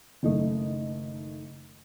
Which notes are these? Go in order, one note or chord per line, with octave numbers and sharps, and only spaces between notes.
F#1 D#3 A3 D#5